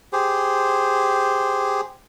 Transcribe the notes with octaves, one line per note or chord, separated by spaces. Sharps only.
G4 G#4 C5